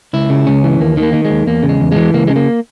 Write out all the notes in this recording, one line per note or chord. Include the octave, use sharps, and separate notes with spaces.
C#2 E4
C#3
C#2 C#4
E3
D#2 A#3
D#3
A#3
D#3
G#3
D#2
E2 A#3
C#3
G#3
E2
E3 G#3
C#2 A#3
C#3 G#3
A#3